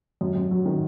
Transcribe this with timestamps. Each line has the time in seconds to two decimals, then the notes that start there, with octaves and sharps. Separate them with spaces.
0.21 F#2
0.36 F#2
0.51 F#3
0.66 D#3